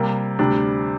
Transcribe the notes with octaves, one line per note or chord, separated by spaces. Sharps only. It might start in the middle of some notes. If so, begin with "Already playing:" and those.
Already playing: C3 G3 A#3
D2 C3 G3 D4